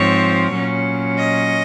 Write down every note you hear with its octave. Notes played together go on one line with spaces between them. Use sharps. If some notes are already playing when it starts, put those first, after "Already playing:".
Already playing: G#2 F3 C4 C#5
A#2 F#3 C#4
D#5